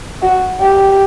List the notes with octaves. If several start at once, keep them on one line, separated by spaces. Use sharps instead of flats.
F#4
G4